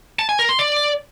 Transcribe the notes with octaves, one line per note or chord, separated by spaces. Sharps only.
A5
G#5
A#4
C6
D5